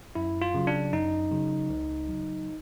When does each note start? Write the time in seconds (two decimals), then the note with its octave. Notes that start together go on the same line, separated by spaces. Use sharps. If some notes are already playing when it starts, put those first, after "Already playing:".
0.15 F#2 E4
0.42 F4
0.54 C#3 F#3
0.67 D4
0.93 F#2 D#4
1.31 C#3 F#3
1.70 C#2
2.08 C#3 F#3